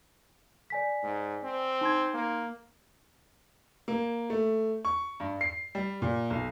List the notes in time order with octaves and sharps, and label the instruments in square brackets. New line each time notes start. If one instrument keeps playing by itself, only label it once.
[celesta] D5 G#5 B6
[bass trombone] G#2
C4
[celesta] D#4 C6 G#6
[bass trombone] A#3
[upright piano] A#3
A3
C#6
G2
C7
G3
A#2
B1